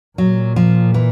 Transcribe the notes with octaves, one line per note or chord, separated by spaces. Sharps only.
A#2 F#3
F3
E3